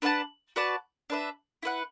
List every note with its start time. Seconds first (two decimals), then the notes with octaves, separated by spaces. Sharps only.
0.02 D4 B4 F#5 A5
0.56 F#4 B4 D5 A5
1.10 D4 B4 E5
1.63 E4 B4 F#5